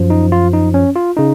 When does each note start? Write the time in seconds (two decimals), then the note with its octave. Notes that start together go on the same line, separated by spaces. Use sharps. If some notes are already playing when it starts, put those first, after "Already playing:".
Already playing: F#2 F3
0.10 D#4
0.32 F4
0.53 D#4
0.74 C#4
0.96 F4
1.17 C#3 D#4